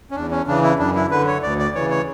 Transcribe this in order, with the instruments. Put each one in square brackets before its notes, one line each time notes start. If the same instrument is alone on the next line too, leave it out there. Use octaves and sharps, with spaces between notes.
[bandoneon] C#4
E2 D4
C#4
C#3 E3 D4
E4
F#2 D4
E4
D3 B4
C#5
D2 D5
D5
C#3 E3 C#5
C#5